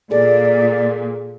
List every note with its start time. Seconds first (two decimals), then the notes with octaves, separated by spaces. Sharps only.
0.11 A#2 G#4 A4 D5